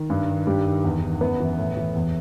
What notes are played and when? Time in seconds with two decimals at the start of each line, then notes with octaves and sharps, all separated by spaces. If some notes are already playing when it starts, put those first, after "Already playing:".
Already playing: D#3
0.10 G2
0.28 D#3
0.47 G2 G3 G4
0.65 D#3
0.84 E2
1.02 D#3
1.21 F#2 B3 B4
1.40 E3
1.58 A2
1.77 E3
1.95 E2